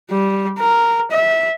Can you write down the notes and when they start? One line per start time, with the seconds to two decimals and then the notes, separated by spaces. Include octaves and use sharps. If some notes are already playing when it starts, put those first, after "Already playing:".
0.10 G3
0.59 A#4
1.11 E5